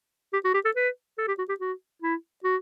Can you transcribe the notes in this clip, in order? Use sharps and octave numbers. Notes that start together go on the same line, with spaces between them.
G4
F#4
G4
A4
B4
A4
G4
F#4
G4
F#4
E4
F#4